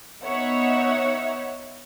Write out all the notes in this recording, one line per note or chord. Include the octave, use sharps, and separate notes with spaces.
B3 D#4 C#5 E5 F#5